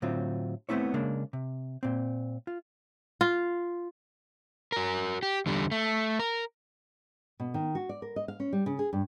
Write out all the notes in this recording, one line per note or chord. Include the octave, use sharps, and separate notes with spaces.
A2 D3 F#3 C4 F4
A3 B3 C4 E4 C#5
C#3 G#3 A#3 D4
C3
A#2 C4
F4
F4
F#4 A#4
G4
E2 D3 G3
A3
A#4
B2
D#3
F#4
D5
A#4
D#5
F5
C#4
G3
C#3
G#4
G2